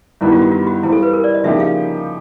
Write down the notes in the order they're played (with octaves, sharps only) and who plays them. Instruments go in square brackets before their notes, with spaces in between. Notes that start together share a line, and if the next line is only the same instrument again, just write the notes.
[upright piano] G2 D#3 G3 B3 [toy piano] E4
[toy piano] F4
F#4
F4
F#4
[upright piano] E3 G3 C4 F4 [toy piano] E4
[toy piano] A4
B4
A#4
D5
D#5
[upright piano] C#3 F3 A#3 D#4 G4 [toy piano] E5
[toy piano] F5